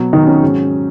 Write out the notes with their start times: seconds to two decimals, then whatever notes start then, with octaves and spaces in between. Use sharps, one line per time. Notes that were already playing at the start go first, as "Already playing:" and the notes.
Already playing: B2 F#3
0.13 D#3 D#4
0.27 C#4
0.43 G#2 F#3